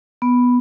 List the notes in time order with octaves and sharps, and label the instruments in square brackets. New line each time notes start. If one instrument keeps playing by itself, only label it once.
[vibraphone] B3